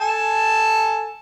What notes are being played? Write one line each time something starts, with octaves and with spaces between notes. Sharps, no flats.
A4 G#5 A5